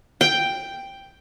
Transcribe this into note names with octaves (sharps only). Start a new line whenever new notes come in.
G5